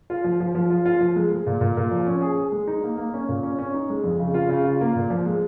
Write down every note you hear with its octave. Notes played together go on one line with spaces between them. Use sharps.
F4
F3
F3
F3
F4
F4
F3
G#3
G#3
A#2
A#2
A#2
F3
C#4
G#4
G#4
G#3
D#4
A#3
A#3
C#4
A#2
C#4
C#4
D#4
G#3
F2
C#3
F4
C#3
F4
A#3
A#2
F3
G#3